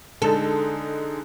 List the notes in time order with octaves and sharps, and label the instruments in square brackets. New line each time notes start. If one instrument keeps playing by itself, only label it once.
[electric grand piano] D3 G#3 D#4 [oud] A4